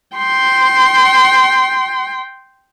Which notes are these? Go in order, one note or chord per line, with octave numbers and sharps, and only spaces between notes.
G5 C6